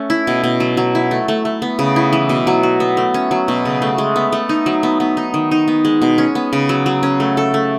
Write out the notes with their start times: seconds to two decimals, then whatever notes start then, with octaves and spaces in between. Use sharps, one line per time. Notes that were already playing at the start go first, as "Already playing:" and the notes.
Already playing: A3 C#4
0.10 E4
0.27 B2
0.44 B2
0.60 F#3
0.77 F#3
0.95 E4
1.11 A3
1.28 A3
1.45 A3
1.62 B3
1.79 C#3
1.96 E4
2.13 E3
2.29 B2
2.47 F#3
2.63 F#4
2.80 B3
2.97 A3
3.14 C#4
3.31 F#3
3.48 B2
3.65 C#3
3.82 A3
3.98 G#3
4.16 B3
4.32 A3
4.49 D#4
4.66 F#3
4.83 B3
5.00 B3
5.17 D#4
5.34 D#3
5.51 D#4
5.68 B3
5.85 G#3
6.02 B2
6.18 C#4
6.35 B3
6.53 C#3
6.69 F#3
6.86 F#3
7.03 C#4
7.20 A3
7.37 A4
7.54 A3